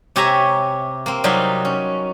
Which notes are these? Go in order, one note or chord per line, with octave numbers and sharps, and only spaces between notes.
C3 G4 C#5 E5 G#5 A#5
A#3 C4
C3 F#3 G3 D#4 F4 C5
C#4